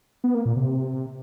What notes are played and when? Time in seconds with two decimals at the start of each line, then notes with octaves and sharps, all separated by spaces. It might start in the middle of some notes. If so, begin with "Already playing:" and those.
0.24 B3
0.35 A#3
0.45 A#2
0.56 C3